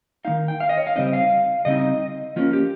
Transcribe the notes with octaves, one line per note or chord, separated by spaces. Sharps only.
D#3 G#3 D#4 F5
G5
F5
D#5
C#5
F5
C#3 G3 C4 D#4 D#5
F5
C#3 G3 C4 D#4 D#5
F3 A#3 C#4 F4
G4